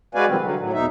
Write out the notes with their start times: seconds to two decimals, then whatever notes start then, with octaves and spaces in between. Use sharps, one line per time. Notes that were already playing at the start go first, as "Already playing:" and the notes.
0.15 G#3 F#4 B4 D5 F5 G#5
0.28 C3 D#3 F3 G3 C4
0.41 D3 F#3
0.59 A2 F#3
0.73 E2 B2 D#4 E5